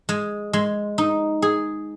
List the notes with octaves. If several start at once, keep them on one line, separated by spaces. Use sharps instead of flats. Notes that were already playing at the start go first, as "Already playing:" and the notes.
G#3
G#3
D#4
G#4